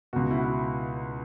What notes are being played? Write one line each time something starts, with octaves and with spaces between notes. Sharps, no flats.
C#2 B2 F#4
E4
F#4
E4